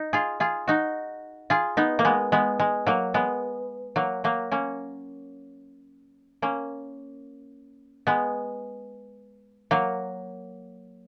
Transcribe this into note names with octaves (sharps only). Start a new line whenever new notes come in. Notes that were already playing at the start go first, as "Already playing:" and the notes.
Already playing: D#4
F4 G#4
F4 G#4
D#4 F#4
F4 G#4
B3 D#4
A#3
G#3 B3
G#3 B3
G#3
F#3 A#3
G#3 B3
F#3 A#3
F#3 A#3
A#3 C#4
A#3 C#4
G#3 B3
F#3 A#3